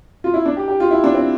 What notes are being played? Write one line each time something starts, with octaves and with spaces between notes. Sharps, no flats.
F4
E4
D4
G4
G4
F4
E4
D4
C4